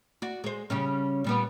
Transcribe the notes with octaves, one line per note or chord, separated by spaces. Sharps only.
F#4 D5
G#3 C5
C#3 G3 C#4
A#2 G3 B3